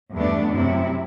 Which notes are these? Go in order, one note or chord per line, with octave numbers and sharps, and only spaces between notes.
E2 G2 A3 B3 D4
F#2 C3 E4